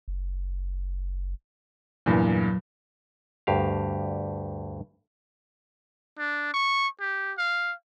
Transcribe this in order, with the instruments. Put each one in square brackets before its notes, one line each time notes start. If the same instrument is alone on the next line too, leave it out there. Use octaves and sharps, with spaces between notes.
[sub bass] F#1
[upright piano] E2 G2 A#2 [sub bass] F#3
[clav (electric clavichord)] D2 G2 G4 F5
[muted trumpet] D4
C#6
G4
F5